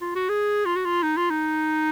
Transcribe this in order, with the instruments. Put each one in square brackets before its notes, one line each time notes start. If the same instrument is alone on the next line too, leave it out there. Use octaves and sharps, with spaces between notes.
[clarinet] F4
F#4
G#4
F4
F#4
F4
D#4
F4
D#4